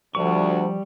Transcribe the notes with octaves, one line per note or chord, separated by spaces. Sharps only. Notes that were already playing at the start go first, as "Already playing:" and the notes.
D2 F3 G3 C#6